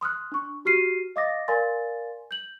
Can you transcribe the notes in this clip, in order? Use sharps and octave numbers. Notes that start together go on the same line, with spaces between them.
C6 D#6 F6 F#6
D4 C#6
F#4 G4 F6 C7 D#7
D#5 F5 D6 D#6 A6 A#6
A#4 D5 F5 G#5 C6 A6
G6 F#7